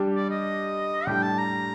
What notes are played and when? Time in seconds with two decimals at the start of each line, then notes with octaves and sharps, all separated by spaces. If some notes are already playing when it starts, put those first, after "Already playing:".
Already playing: G3 D4 G4
0.15 D5
0.30 D#5
1.07 A2 G3 D4 G4 G5
1.23 A5
1.38 A#5